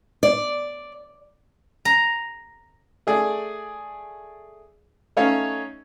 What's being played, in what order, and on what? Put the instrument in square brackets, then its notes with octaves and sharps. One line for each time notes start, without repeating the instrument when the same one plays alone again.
[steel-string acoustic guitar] D5
[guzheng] A#5
[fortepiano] A3 G#4 D5
A3 C#4 D#4 C#5 F5